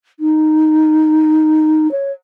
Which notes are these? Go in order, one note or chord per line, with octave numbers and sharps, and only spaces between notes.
D#4
C#5